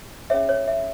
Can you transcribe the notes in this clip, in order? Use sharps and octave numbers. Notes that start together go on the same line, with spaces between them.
C#4 G#4 C#5 E5
C#5
E5